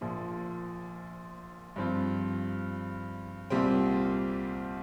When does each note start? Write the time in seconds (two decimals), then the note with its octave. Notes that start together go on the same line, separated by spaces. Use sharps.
0.01 A#1 A#2 F3
1.76 G2 F3 C4 F4
3.50 C2 A#2 G3 C4